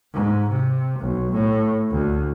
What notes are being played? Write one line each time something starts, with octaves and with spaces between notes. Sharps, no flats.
G#2
C3
B1
A2
D2